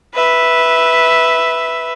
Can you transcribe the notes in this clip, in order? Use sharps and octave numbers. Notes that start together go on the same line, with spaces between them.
B4 E5